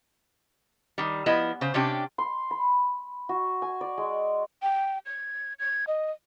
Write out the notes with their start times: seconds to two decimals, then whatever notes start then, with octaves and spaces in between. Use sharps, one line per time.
0.98 D#3 G3
1.26 F3 B3 E4 D#5
1.61 C#3 C5
1.74 C3 C#4 D4 G4
2.18 C6
2.51 B5
3.29 F#4
3.62 G#5
3.81 D5
3.98 G#3
4.63 G5
5.06 G#6
5.59 G#6
5.87 D#5